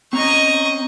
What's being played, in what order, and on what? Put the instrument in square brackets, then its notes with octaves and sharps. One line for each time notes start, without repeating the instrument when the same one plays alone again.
[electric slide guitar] C4 C#4 A#5 [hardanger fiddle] D#5 C#6